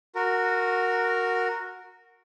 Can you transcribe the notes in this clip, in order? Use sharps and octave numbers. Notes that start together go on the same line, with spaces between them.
F#4 A#4